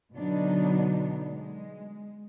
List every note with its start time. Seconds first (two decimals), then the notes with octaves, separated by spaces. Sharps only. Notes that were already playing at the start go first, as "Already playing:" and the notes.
0.13 B2 D3 F#3 B3 D4 D#4
1.29 G#3